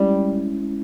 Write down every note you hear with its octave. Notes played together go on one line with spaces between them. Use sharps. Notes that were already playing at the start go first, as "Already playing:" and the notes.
Already playing: G3 G#3 C#4 E4